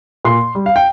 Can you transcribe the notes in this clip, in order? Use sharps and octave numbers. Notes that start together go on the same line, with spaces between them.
A#2 C6
G3
F5
G5